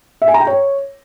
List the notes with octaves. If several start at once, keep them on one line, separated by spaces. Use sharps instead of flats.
E5
G#5
A#5
G5
C#5